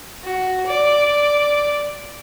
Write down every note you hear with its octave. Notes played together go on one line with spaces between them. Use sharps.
F#4
D5